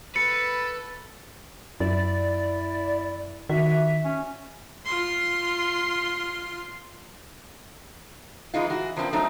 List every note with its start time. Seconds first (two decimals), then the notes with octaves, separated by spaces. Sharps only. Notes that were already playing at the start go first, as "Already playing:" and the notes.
0.16 A4 B4 C#7
1.80 F#2 E4 D5
3.49 D#3 F#4 E5
4.04 C#4
4.86 F4 C6
8.54 E3 G#3 D#4 F4
8.70 E3 F#4
8.96 E2 F3 A#3 C4 D4
9.13 F3 F#3 A3 C4 D#4